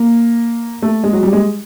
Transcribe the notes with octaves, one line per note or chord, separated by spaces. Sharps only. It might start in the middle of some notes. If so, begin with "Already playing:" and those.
Already playing: A#3
A3
G#3
F#3
G3
G#3